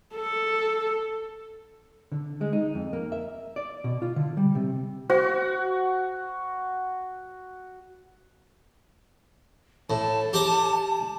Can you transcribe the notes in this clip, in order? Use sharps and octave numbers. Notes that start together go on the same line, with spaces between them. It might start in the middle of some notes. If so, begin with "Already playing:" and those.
A4
D3
G#3
D#4
F2
A#3
E5
D5
B2
F4
D3
G3
C3
F#4 C5
A2 A5
G4 D5 A#5